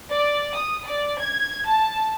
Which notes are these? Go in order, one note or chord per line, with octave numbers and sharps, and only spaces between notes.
D5
D#6
D5
G#6
A5